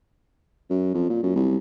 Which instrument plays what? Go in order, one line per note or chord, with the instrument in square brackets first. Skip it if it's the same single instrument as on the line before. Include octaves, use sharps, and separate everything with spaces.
[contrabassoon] F#2
F2
A#2
F#2
C2